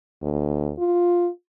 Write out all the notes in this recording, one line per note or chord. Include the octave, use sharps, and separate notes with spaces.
D2
F4